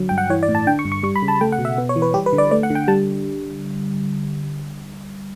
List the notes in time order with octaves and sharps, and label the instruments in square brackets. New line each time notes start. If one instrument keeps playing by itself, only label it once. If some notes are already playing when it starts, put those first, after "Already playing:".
Already playing: [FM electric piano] D3 F#3
G2 G5
F#5
E3 C#5
D5
A2
A5
D3 G5
C#6
G2
C#6
G3 C#6
B5
C#3
A5
A3 G5
F#5
B2
E5
B3
C#5
E3
B4
G3 G4
B4
D3
D5
A3 D5
F#5
D3
G5
G3 A5